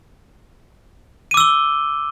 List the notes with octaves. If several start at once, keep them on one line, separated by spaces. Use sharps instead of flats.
D6 E6 D#7 G7